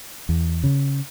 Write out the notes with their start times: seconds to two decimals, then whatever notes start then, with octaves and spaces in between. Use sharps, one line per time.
0.29 E2
0.64 C#3